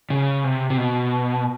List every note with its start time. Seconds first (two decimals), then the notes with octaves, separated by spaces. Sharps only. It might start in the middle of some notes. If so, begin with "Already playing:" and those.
0.10 C#3
0.44 C3
0.70 C3
0.78 B2